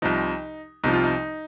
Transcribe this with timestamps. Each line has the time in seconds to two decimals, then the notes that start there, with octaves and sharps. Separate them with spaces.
0.02 C2 C3 F3 D#4
0.84 C2 C3 F3 D#4
0.93 F4
1.04 D#4